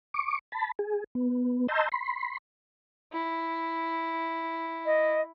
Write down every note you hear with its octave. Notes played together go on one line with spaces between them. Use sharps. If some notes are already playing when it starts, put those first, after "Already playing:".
C#6 D6
A5 B5
G#4
B3
D#5 A5 A#5 C6 E6 G6
B5 C6
E4
D#5